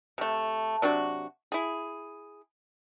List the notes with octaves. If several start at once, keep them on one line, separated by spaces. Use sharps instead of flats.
C3 A3
C3 F#3 D4 F#4
E4 G#4